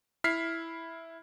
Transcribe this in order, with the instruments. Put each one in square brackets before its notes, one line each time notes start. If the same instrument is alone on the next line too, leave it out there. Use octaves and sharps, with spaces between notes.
[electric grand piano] E4 F6 B6 C7